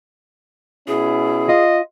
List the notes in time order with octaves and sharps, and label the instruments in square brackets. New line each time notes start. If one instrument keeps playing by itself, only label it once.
[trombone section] B2 C#4 E4 [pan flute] G#4
[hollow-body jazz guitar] F4 [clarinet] D#5